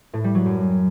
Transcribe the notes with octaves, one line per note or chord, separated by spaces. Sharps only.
A2
G3
F#3
F#2